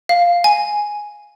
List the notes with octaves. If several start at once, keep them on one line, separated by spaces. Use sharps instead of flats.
F5
G#5